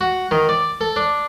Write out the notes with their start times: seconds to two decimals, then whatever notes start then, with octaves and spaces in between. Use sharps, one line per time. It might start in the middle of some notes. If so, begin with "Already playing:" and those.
0.01 F#4
0.31 D#3
0.49 D5
0.81 A4
0.96 D4